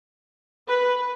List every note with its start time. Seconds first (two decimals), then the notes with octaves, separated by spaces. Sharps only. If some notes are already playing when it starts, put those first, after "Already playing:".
0.67 B4